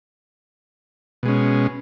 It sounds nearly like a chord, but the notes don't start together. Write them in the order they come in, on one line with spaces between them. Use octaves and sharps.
B2 G#3 C#4